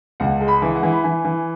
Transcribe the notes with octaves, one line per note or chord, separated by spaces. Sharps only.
C#2 F#5
G#3
B5
E3
F#5
E3
B5
E3 G#5
E3